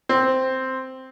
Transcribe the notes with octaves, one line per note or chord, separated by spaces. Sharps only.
C4